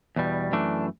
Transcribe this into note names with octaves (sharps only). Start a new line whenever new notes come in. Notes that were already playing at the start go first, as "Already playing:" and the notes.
E2 B2 G3
F#2 E3 A3 D4